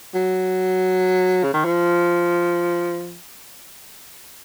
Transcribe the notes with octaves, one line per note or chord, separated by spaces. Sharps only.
F#3
C#3
D#3
F3